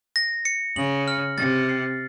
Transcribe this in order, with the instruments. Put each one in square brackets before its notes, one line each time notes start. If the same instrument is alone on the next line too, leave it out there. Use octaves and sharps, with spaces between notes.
[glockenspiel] A#6
C#7
[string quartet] C#3 [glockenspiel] F#7
[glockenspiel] F6
[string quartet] C3 [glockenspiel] A6
[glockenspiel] C7